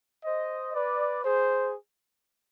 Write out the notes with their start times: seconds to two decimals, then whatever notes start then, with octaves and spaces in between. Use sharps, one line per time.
0.24 C5 D#5
0.74 B4 D5
1.22 G#4 C5